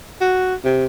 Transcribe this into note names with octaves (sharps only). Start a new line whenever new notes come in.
F#4
C3